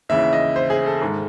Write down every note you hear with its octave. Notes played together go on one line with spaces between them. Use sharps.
D#2 C#3 E3 E5
D#5
C5
G#4
A4
G#2 D#3 G#3